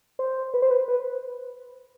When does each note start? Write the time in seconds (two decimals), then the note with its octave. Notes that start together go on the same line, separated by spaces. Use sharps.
0.19 C5
0.54 B4
0.62 C5
0.71 B4
0.88 B4